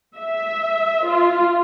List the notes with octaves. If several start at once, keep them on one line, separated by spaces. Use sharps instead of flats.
E5
F4